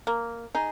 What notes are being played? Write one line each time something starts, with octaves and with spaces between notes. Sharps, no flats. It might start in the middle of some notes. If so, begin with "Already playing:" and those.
A#3
D#4 G#4